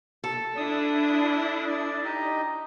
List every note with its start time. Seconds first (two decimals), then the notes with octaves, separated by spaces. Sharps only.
0.24 A4
0.57 D4 E4 D#6
1.68 D5
2.04 D#4 G4 D#5